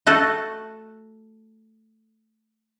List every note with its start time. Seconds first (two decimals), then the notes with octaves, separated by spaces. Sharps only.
0.07 A3 F#4 A4